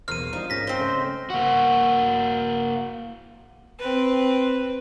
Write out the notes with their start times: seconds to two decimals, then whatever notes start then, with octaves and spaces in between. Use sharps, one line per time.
0.08 B1 E2 A#3 C5 F6 D#7
0.33 F3 G3 D#4 D#5
0.50 G#2 C#4 A#4 A#6 B6
0.67 C4 C5
0.80 C#3 G#3 A3
1.30 A#3 F#4
3.79 C4 B4